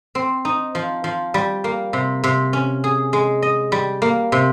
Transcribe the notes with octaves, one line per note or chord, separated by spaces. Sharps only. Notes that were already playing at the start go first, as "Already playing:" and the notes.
C4
D#4
F3
F3
G3
A#3
C3
C3
C#4
G#4
G#3
D#5
G3
A#3
C3